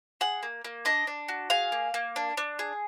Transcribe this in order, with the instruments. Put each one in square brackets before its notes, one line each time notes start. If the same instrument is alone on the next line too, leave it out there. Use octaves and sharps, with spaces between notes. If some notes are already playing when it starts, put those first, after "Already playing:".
[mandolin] G#4 F#5
A#3
A#3
D4 D#5
D4
F#4
G#4 F5
A#3
A#3
D4
D4
G#4